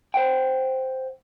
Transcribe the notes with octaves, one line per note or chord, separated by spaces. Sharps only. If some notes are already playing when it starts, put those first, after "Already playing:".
C5 F#5 G5